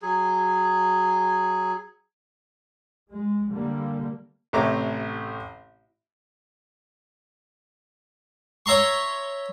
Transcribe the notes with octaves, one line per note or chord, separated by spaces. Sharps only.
F#3 G#4
G#3
D3 G3 A#3
A1 C3 A3 C#5 A#5 D6
C#5 E5 A#5 C6 C#6